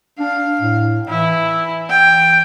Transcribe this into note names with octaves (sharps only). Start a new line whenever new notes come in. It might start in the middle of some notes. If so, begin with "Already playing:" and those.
D4 F5
A2
E3 E4
G5